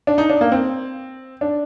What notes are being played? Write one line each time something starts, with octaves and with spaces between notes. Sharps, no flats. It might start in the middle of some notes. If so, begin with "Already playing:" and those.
D4
D#4
D4
A#3
C4
D4